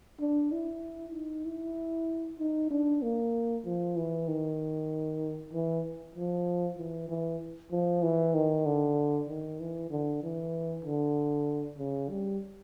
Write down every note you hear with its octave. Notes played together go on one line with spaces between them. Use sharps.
D4
E4
D#4
E4
D#4
D4
A#3
F3
E3
D#3
E3
F3
E3
E3
F3
E3
D#3
D3
D#3
E3
D3
E3
D3
C#3
G3